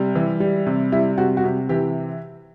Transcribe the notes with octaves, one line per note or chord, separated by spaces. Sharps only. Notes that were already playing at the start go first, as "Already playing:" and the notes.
Already playing: C3 G3
E3
G3
C3
G3 E4
C3 F#4
F#4
C3 G4
E3 G4